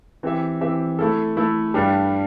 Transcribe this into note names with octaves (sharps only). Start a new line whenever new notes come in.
E3 C4 G4 E5
E3 C4 G4 E5
A3 E4 A4
A3 E4 A4
G2 G3 D4 G4